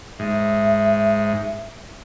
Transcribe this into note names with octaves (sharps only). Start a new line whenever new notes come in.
G#2 E5